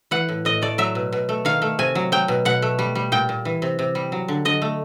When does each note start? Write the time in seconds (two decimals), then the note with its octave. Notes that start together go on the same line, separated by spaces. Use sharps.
0.11 E3 F#5
0.29 A2
0.45 A2 D#5
0.62 A3 D5
0.78 F#3 E5
0.95 B2
1.12 B2
1.29 A3
1.45 D#3 F5
1.62 A3
1.79 C3 G#5
1.95 F#3
2.12 F#3 G5
2.28 B2
2.45 B2 F#5
2.62 A3
2.79 G3
2.95 G3
3.12 A#2 G5
3.29 A#2
3.45 E3
3.62 C3
3.79 C3
3.95 G3
4.12 F#3
4.28 D3
4.45 D3 D#5
4.62 A3